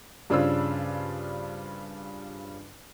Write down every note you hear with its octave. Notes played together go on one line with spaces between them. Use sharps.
G2 C#3 D4 F4 C5 E6